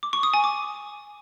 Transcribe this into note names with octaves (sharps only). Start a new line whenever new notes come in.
D6
C#6
D#6
G#5
D6